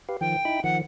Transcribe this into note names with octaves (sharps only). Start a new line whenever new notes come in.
G4 B4 F5
D#3 F3 G5
D#4 E4 B5
D#3 F3 F#5